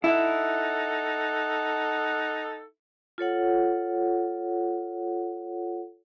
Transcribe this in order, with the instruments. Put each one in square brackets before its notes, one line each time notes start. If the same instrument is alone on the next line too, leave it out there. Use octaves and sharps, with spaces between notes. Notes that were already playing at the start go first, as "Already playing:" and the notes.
[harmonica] D#4 A4 F#5 [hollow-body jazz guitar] E4
[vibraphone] F4 A4 C#5 F#5